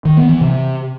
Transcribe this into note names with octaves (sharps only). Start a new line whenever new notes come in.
D#3
B3
E3
C3